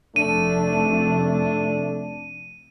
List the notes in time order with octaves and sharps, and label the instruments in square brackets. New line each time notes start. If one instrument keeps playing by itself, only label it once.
[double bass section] F1 [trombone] A3 [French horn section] D4 [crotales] D#7